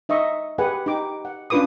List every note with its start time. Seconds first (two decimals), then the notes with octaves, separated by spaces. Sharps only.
0.09 D#4 D#5 E5 C#6
0.58 G4 G#4 B4 F#5 G#5
0.86 D#4 G4 D6
1.25 F#5
1.50 C#4 D4 F4 B4 D6 D#6